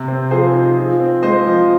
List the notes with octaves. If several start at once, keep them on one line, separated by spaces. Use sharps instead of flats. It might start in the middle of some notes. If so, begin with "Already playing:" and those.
Already playing: C3
C4
F3 G#4 C5
D#4
F3
C4
G#3 C5 D#5
F3